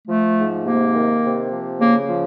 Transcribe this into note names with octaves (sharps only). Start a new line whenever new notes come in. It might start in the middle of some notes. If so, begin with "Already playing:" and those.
F3 A3
G#2
C3 A#3
D#3
C3
F3
C#3 A#3
F3